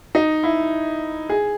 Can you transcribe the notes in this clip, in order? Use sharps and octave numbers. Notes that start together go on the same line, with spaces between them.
D#4
E4
G#4